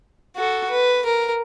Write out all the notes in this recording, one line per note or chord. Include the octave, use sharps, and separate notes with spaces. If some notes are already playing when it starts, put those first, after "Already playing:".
F#4 A4
B4
A#4